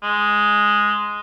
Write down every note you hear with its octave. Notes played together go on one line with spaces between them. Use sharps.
G#3